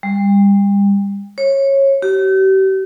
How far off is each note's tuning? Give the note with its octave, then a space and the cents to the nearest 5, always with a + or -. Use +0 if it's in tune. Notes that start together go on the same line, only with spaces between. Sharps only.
G3 +35
C#5 -20
G4 -40